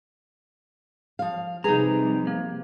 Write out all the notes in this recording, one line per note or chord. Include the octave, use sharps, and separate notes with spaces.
F3 F5
C3 F3 G3 D#4 G#4 B4 A#5
A#3